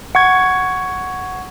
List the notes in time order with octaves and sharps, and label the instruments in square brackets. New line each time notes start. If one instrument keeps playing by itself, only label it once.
[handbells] F#5 C#6 G#6